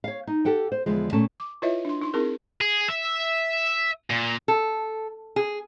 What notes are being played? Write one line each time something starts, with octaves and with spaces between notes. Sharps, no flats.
C#5 F5
D#4
G4 A4 F#5 G5
C5
E2 D3 F3 G#3
A#2 A3 C#4 A4 A5
D6
E4 F4 B4 C#5 D#5 E5
D4 C6
D#4 C6
C4 D#4 E4 G#4 A#4
G#4
E5
A#2
A4
G#4